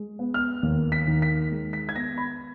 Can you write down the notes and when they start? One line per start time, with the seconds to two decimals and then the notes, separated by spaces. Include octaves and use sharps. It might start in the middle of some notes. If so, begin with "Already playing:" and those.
Already playing: G#3
0.19 B3
0.34 F6
0.63 D#2
0.92 B6
1.07 D#3
1.22 B6
1.51 G#3
1.73 B6
1.89 G#6
1.95 B3 A#6
2.18 B5